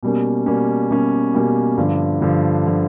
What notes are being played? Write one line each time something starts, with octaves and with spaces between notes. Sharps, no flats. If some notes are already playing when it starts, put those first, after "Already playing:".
B2 G3 A#3 C#4
B2 G3 A#3 C#4
B2 G3 A#3 C#4
B2 G3 A#3 C#4
G2 D3 F3
G2 D3 F3
D3 F3